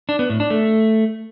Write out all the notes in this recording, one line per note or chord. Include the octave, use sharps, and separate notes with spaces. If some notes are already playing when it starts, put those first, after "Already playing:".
D4
B3
A2
D4
A3